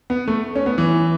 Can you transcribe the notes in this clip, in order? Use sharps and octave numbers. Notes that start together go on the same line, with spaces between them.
B3
A3
C#4
B3
E3